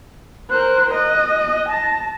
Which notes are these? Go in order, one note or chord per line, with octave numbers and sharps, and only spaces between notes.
A#4 C5 F#6
D#5 F#6
F#6
A5 A#6